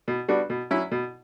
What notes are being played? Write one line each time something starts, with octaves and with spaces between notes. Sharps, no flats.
B2
G3 B3 D4 F#4
B2
F#3 C#4 E4
B2